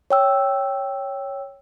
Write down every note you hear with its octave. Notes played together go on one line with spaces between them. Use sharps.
C#5 G5 E6